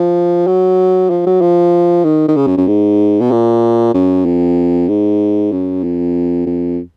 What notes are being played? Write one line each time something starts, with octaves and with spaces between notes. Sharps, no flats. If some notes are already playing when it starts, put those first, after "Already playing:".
Already playing: F3
F#3
F3
F#3
F3
D#3
D#3
C#3
F#2
F#2
G#2
B2
A#2
F#2
F2
G#2
F#2
F2
F2